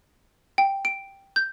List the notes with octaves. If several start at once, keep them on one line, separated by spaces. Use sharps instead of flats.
G5
D7
G6